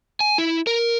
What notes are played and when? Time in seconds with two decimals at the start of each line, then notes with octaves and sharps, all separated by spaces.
0.21 G#5
0.38 E4
0.67 A#4